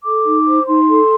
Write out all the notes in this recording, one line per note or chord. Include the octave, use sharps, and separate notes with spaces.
A4 D6
D#4
C5
D#4 C6
A4